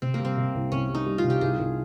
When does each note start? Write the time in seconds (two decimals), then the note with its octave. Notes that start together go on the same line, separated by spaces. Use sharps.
0.02 C3 C4
0.14 A#3
0.20 G3
0.25 C4
0.37 C3
0.55 C2
0.71 C2 C#4
0.89 G3
0.95 D#4
1.06 G3
1.18 F4
1.24 C3
1.30 G4
1.41 C2 G#4
1.59 C2